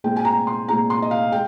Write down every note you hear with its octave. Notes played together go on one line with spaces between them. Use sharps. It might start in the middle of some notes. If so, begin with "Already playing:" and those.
A#2 G#3 C4 G5
G#5
A#5
C6
A#2 G#3 C4 A#5
C6
D#5
F5
G#3 G5